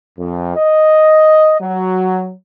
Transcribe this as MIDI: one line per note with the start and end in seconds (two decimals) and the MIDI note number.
0.18 0.53 41
0.56 1.56 75
1.61 2.32 54